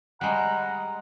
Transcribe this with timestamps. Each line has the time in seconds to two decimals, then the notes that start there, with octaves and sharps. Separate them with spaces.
0.21 G3 G#3 F#5 A#5